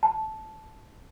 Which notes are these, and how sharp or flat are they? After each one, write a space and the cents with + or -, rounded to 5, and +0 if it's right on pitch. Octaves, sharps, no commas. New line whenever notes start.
A5 -10